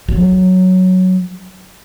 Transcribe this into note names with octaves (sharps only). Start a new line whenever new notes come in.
F#3